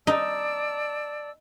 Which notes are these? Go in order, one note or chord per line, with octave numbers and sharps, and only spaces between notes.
D#4 D5 A5 E6